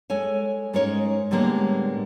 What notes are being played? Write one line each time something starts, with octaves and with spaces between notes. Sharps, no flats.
G#3 A4 C#5 G#5
G#2 G#3 C#4 D#4 A#4 C#5
A2 D3 G3 G#3 A#3 B3